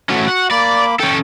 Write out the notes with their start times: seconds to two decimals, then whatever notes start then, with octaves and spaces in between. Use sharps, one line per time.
0.09 A3 C#4 F#4
0.28 F#5
0.51 A#3 D5 B5 D6
1.00 C#4 A4 G5